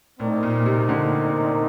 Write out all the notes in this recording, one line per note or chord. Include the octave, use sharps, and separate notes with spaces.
A2 C4 D#4 A#4 D5
A#2
C3
D3